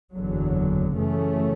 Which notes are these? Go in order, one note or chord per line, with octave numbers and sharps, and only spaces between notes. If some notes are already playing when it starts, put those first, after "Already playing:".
F#1 E2 D3 F#3
F#2 C#3 E3 A3 C#4